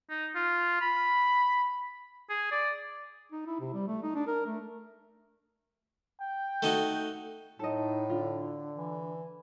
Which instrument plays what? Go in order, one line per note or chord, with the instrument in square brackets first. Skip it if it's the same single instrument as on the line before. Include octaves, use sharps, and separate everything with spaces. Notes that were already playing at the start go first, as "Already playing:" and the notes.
[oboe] D#4
F4
B5
G#4
D5
[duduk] D#4
E4
C3
G3
A3
D#4
D4
A#4
A3
[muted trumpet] G5
[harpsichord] A3 D#4 F#4
[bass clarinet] A2 [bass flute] D#4 [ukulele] A4 D#5
[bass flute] D3 [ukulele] F4
[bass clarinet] E3